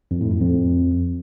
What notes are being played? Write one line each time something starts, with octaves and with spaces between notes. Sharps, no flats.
F2
A2
F#2
F2